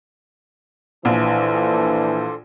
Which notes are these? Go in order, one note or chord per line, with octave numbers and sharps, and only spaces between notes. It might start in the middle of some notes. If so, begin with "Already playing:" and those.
A#1 E3 D4 A4 C5